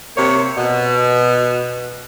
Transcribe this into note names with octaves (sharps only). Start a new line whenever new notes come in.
C3 A#3 C#5
B2